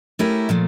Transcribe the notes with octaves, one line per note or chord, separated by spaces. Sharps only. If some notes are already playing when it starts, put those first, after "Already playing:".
A3 C#4 E4 G4 A#4
A#2 F3 A3